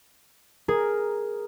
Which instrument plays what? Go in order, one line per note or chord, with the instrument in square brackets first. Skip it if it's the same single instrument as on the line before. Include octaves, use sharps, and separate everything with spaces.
[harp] G#4 [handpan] A#4